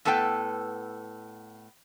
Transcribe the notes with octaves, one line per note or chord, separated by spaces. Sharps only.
A2 B3 A4 B4 G5